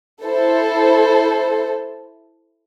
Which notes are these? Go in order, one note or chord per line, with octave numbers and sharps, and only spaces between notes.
E4 A4 C5